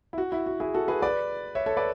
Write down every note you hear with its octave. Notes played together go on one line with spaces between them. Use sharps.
E4
F#4
E4
F#4
E4 G#4
F#4 A4
G#4 B4
B4 D5
C#5 E5
A4 C#5
B4 D5